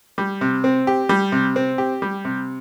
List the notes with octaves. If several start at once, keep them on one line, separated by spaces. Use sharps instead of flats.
G3
C3
C4
G4
G3
C3
C4
G4
G3
C3